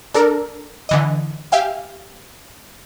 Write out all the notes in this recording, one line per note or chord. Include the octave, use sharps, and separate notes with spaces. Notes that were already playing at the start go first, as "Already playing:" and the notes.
D4 A4 A#4
D3 E3 D#5
G4 E5 F5 G5 G#5